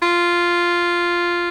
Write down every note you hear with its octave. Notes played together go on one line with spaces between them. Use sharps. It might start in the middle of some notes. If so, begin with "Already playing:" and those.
F4